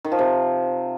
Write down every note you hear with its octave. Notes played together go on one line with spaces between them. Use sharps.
D#3
F3
C3